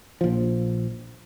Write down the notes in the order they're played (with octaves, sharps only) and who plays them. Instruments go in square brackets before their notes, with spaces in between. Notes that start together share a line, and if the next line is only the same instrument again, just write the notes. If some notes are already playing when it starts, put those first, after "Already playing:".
[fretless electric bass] A#1 F3